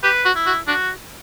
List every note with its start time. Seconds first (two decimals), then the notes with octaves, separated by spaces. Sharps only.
0.03 G4 B4
0.25 F#4
0.35 E4
0.46 F#4
0.67 D4 F#4